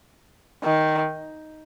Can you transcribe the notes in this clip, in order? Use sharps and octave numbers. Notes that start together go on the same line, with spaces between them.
D#3